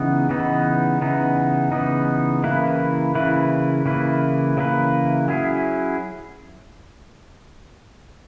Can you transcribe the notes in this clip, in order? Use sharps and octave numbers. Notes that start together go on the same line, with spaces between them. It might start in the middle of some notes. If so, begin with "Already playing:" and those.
Already playing: C#3 E3 B3 D#4
C#3 E3 B3 D#4
C#3 E3 B3 D#4
C#3 E3 B3 D#4
C#3 E3 A#3 E4 B4
C#3 E3 A#3 E4 B4
C#3 E3 A#3 E4 B4
C#3 E3 A#3 E4 B4
F#3 C#4 E4 G#4